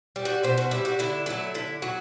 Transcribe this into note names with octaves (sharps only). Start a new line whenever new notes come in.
G3
F#4
B2 C5
F#4
G3 E4
F#4
D3 E4
F#3 A3 E4
D3 E4
F#3 F#4